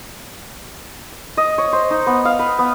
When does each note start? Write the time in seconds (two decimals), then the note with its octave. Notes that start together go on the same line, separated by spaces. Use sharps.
1.37 D#5
1.58 C#5
1.73 C5
1.90 D#4
2.06 B3
2.25 F5
2.39 B4
2.59 B3